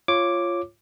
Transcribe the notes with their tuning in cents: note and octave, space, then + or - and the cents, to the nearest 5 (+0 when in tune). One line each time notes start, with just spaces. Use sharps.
F4 -10 C#5 -10 D6 +0